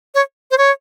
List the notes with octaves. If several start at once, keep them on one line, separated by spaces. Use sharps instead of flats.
C#5
C5
C#5